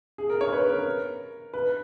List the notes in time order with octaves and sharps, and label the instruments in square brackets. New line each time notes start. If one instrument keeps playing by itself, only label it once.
[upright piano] G#4
A#4
C#5
B4
A#4
B4